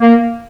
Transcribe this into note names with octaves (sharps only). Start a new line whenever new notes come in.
A#3